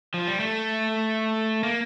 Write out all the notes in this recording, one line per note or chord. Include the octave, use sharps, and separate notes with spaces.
F3
G3
A3
A#3